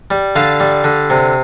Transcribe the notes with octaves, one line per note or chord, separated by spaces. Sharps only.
G3
D3 F5 A5
G3
D3
C3